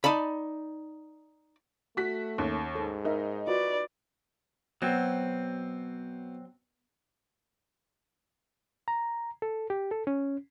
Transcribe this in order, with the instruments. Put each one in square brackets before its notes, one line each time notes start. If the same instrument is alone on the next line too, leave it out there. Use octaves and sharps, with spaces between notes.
[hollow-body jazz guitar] D#4 D5 A5 B5
[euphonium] A3 [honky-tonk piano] F#4 B6
[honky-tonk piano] D#2 [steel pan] C#4
[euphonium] G#2 [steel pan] A4
[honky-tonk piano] D#4 [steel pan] A#4 E5
[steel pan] F4 F#4 [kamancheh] B4 D5
[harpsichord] B2 [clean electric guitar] F#3 C4
[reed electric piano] A#5
A4
G4
A4
C#4